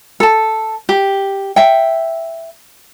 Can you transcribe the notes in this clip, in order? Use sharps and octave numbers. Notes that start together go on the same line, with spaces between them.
A4 A5
G4
E5 G5